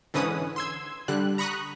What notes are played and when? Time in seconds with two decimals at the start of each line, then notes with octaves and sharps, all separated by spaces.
0.14 G#2 D3 E3 C#4 B4 D#6
0.56 C6 E6 G#6
1.08 D3 G3 F#6
1.38 A#5 B5 C#6 D#6 F#6